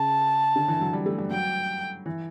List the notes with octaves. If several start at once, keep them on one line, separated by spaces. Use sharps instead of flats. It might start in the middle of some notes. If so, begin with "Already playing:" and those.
Already playing: C#3 A5
D3
E3
F#3
G3
A3
G3
F#3 G5
E3